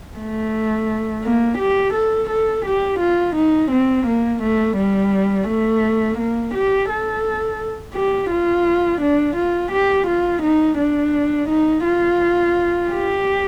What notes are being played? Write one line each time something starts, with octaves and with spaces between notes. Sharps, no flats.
A3
A#3
G4
A4
A4
G4
F4
D#4
C4
A#3
A3
G3
A3
A#3
G4
A4
G4
F4
D4
F4
G4
F4
D#4
D4
D#4
F4
G4